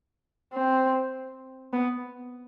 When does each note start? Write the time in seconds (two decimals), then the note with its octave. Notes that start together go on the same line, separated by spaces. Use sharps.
0.53 C4
1.73 B3